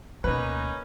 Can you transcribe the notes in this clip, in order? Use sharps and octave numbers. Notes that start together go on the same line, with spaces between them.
D2 B2 A#3 C#4 D#4 B4